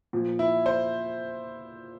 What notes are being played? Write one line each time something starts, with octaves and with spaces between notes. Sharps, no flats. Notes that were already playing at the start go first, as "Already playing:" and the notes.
A#2 F3
E4
C5